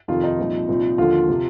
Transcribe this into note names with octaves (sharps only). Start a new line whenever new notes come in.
F2 C3 D#3 F4
D#4
C2 A#2 F3
C2 A#2 F3
D#2 D3 F3 F4
C3 F3